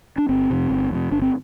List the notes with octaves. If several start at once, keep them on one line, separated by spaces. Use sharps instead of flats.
D4
G1 C4
F2 C3
G1
F2 C3
G1 D4
C4